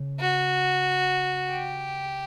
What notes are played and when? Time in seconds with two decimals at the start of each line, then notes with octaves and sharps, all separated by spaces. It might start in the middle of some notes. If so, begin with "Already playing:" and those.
Already playing: C#3
0.20 F#4
1.50 G4